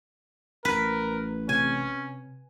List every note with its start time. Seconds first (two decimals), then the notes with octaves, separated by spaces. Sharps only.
0.65 A1 A#4 B4
1.49 C3 C#4 G#5